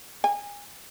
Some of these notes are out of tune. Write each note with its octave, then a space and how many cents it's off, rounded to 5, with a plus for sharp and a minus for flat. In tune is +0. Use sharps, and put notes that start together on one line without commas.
G#5 -25